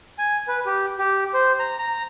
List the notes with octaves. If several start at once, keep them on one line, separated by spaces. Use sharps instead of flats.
G#5
B4
G4
G4
C5
A#5
A#5